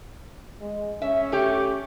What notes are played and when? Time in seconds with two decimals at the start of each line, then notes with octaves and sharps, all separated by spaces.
0.61 G#3
1.02 C#4 E5
1.32 A3 G4